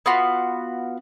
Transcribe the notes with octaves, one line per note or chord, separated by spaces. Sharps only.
B3 F4 F#4